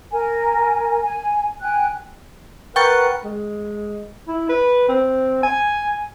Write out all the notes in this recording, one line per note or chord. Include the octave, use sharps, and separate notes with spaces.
A#4 G#5
G#5
G5 G#5 F#6
A#4 B4 F#5 G5 C#6 A6
G#3
E4
B4
C4
G#5